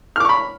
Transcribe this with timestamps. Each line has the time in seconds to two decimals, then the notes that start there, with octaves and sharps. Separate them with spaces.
0.16 F6
0.20 D6
0.25 C#6
0.29 B5